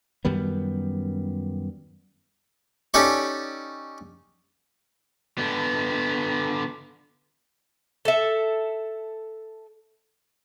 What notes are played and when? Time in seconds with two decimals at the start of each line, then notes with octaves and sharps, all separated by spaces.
0.25 F#2 D#3 G3 B3
2.94 C#4 D#4 G4 A4 D5 C#6
5.38 D3 B3
8.05 A4 E5